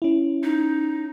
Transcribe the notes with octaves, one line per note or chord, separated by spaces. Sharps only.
C#4 E4
D#4